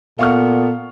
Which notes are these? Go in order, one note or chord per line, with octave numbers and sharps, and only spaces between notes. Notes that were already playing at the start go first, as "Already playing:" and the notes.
A#2 B3 A4 F5 C#6 F6